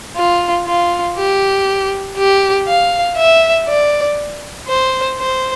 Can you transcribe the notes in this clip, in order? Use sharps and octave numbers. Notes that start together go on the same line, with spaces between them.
F4
F4
G4
G4
F5
E5
D5
C5
C5